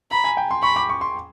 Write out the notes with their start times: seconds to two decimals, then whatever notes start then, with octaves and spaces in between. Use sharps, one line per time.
0.11 A#5 B5
0.24 G#5
0.37 G5
0.51 C6
0.63 B5 C#6
0.76 D6
0.89 C#6
1.01 C6